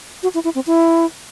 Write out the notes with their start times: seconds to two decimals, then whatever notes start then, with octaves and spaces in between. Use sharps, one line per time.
0.23 F#4
0.34 E4
0.44 E4
0.55 C4
0.67 E4